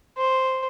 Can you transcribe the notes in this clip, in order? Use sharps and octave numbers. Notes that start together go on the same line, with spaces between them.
C5